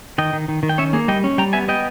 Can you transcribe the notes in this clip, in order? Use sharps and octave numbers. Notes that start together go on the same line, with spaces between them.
D#3 D#5 G5
D#3
D#3
D#3
G5
C#4 C#5 E5
A#3 G#4
G3 D#5 G5
C#4
G3 G5 A#5
B3 E5 G#5
B3 D#5 G5